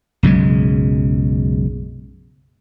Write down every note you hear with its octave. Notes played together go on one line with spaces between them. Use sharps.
B1 F#2 C#3 G#3